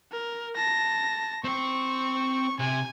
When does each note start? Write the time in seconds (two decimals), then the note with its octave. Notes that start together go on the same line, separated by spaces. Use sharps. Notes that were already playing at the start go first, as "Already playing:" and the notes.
0.12 A#4
0.56 A5 A#6
1.44 C4 C5 C#6
2.60 C3 G#5